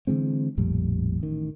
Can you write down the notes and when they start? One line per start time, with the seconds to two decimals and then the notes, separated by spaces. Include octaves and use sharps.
0.07 D3 E3 G#3 C4
0.58 A#1 F2 A2 G3
1.20 A1 D#3